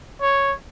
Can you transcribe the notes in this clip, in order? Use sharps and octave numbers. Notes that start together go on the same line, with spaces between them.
C#5